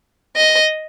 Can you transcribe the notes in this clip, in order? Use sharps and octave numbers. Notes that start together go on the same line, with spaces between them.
D#5